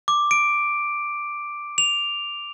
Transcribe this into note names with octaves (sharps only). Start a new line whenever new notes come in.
D6
D7
F7